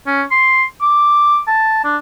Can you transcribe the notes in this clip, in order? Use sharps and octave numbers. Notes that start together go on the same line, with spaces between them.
C#4
C6
D6
A5
D4